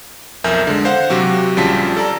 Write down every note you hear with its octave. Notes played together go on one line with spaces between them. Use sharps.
B1 F2 A#4 E5 G#5 G6
D3 G#3
C5 F5 F#5
C3 F#3 F#4 G4
A#1 C#3 G3 F4 A5 B6
A4 D5 A5 A#5